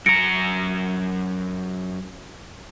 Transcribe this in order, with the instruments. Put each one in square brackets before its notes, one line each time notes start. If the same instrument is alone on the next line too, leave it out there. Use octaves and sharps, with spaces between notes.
[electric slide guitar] F#2 A#5 [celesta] A#6 C#7 D7